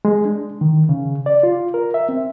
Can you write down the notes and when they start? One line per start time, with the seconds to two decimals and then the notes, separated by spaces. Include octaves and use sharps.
0.05 G#3
0.25 D4
0.61 D#3
0.89 C#3
1.26 D5
1.43 F4
1.74 A#4
1.94 E5
2.09 C4